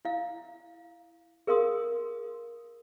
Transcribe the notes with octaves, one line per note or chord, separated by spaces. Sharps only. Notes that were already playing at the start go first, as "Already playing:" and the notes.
E4 F5
G#4 A#4 F5 C6 D#6